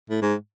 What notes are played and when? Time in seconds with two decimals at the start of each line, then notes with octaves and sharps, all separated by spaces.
0.10 A2
0.22 G#2